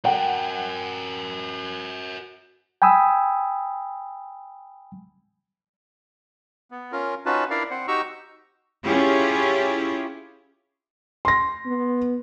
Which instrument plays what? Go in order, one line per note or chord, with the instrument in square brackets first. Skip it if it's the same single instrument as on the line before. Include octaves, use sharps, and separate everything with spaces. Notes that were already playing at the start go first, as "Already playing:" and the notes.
[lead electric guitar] F#4 A#4 [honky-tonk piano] F#5 G5
[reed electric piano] G5 G#5 B5 D#6 E6
[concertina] B3
C#4 F4 A#4
C#4 D#4 F4 F#4 B4 A5
D4 E4 A#4 D5 F5
C4 C5 F#5
D#4 F#4 G4 A#5 C#6 E6
[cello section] C#4 E4 F4 G4 G#4
[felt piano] C6 A#6
[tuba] B3